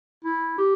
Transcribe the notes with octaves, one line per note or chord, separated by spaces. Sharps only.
E4
G4